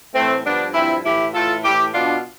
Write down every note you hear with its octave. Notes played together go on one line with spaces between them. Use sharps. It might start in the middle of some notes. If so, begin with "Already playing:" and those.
A2 E3 A3 C4
G2 F3 B3 D4
G2 F3 C4 E4
A2 E3 E4 G4
A2 E3 F4 A4
A2 E3 E4 G4
B2 D4 F4